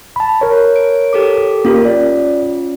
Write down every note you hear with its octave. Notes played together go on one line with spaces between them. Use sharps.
A5 B5
A#4 C#5
D7
G4 A4 D6
A#3 C#4 F4 G4 A#4
D5